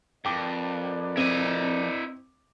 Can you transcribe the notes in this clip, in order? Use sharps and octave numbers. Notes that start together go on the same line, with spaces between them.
F2 A#4 B4 D5 G5 D6
C4 E4 D#5